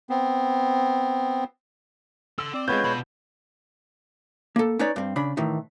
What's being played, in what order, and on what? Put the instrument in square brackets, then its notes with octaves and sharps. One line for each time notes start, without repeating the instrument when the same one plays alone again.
[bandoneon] B3 C4
[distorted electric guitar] A4 F#5 [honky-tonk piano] E6
[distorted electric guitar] C4 [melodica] D5
[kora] G#3 B3 F4 [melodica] B4 C#5 [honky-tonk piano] G6
[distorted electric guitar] B2 B5 [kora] D4
[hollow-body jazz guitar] A#3 A4
C#4 D#4 B4 C#5 D5
G2 C4
C#3 D4 B5
A2 D#3 E3